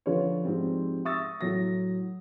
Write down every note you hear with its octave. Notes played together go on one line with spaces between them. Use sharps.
D3 F3 F4 B4 C#5
G#2 F3 G3 C4
E5 C#6 D#6 E6 A6 A#6
A2 F#3 A#6